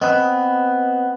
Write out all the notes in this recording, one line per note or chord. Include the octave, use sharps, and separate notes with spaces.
B3 C4 B4 D#5